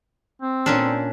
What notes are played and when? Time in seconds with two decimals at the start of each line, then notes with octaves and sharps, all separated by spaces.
0.42 C4
0.66 A#2 C#4 D4